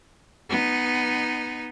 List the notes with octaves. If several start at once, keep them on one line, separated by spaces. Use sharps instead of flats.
B3 D#4